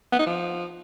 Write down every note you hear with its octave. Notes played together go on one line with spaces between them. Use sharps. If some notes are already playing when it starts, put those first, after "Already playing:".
B3
D#4
F3